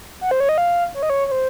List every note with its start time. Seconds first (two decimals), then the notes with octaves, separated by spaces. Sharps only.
0.21 F#5
0.31 C5
0.40 C#5
0.49 D#5
0.58 F5
0.94 C#5
1.03 D#5
1.10 C#5
1.27 C#5
1.31 C5